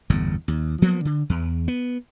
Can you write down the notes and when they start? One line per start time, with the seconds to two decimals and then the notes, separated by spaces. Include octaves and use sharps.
0.10 G1 E2 A2
0.48 D#2
0.82 F3 F#3 A#3 B3
1.05 D3
1.30 E2
1.68 B3